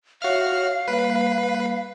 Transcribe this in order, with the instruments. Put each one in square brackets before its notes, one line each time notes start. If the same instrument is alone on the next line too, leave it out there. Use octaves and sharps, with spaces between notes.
[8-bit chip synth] F#4 F6 [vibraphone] C#5 E5 [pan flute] F5
[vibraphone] G3 A#3 [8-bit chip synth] B4